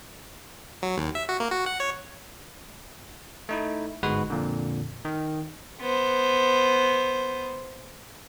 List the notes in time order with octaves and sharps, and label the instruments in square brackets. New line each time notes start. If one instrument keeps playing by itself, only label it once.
[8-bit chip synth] F#3
D#2
E5
F#4
A#3
F#4
F#5
C#5
[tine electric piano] A3 D#4 E4
G1 G#2 G#3 F#4 B4
F2 A#2 D3
D#3
[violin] B3 C5